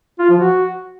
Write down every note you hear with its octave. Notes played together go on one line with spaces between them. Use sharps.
F4
F3
F#4